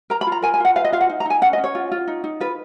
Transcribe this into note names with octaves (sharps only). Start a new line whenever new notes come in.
A#4 A#5
B5
F4
A#5
A#4 G#5
G#5
F4 F#5
B4 F5
D#5
F4 F5
F#5
D#4
A#5
D#4 G#5
C#4 F#5
D#5
C#4
C#5
F4
F4
D#4
D#4
F4 B4